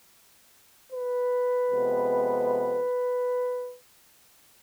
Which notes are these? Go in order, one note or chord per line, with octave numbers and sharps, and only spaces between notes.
B4
F2 C3 G#3 B3